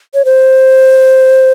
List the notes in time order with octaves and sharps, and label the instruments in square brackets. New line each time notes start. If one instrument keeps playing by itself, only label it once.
[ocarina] C#5
C5